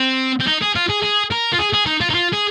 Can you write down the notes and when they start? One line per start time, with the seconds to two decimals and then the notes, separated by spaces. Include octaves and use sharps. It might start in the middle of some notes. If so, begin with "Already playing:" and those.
Already playing: C4
0.40 C4
0.47 D#4
0.62 G#4
0.76 F4
0.90 G#4
1.03 G#4
1.32 A#4
1.53 F4
1.59 G#4
1.73 G#4
1.86 D#4
2.01 F4
2.10 D#4
2.14 F4
2.33 G#4